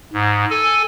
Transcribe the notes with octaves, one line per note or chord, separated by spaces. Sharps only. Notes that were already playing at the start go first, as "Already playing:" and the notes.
G#2
A4 G#5